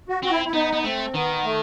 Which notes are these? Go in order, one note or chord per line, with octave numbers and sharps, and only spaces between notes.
F#4
C4 F#4
E4
E4
B3 D#4
B3
A3 C4
D#3 B3
A3